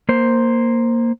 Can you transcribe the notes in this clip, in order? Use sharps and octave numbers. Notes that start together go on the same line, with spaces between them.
A#3 C5